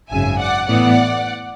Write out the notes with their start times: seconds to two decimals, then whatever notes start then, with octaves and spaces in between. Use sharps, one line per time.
0.10 G#1 F#2 C#3 E5 G#5
0.39 D5 F#5
0.69 A2 E3 B3 D5 F#5